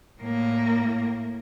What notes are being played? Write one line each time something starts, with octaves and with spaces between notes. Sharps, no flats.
A2 A#3